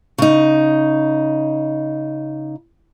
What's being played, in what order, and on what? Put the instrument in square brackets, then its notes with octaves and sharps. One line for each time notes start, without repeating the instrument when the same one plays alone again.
[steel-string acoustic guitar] C#3 D#4